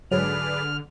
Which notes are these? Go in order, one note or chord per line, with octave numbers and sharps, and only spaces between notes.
G#2 D3 F#3 G#4 B4 D5 F6